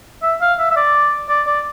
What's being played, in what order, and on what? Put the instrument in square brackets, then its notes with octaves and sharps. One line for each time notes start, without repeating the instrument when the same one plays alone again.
[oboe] E5
F5
E5
E5
D5
D5
D5